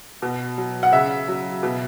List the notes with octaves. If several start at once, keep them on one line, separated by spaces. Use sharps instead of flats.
B2
F#3
F#5
C#3 E5
F#3
B2